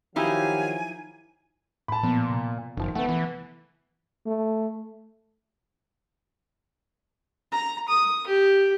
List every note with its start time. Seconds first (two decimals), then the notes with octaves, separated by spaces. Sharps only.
0.16 D#3 F3 F#3 D#4 E4 G4 F5 G#5
1.88 A2 A5 B5
2.03 A#2 F3 B3
2.30 C3
2.77 F#1 D#3 F3
2.95 A3 B3 F#5
3.09 E3
4.26 A3
7.52 A#5
7.88 D#6
8.27 G4